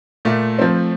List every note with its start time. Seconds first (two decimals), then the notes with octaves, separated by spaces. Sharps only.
0.25 A#2 A3
0.59 F3 C4